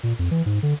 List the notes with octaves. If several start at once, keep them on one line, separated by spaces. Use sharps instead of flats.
A#2
F2
E3
G#2
D3